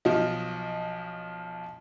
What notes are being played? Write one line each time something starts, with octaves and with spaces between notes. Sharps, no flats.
B1 F3 D#5